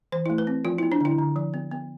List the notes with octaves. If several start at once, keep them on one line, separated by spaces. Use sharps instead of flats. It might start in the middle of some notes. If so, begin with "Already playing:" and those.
E3 C5
A3 E4
B4
C4
F3 F4
B3 E4
D4
D3 E4
D3
F3
B3
B3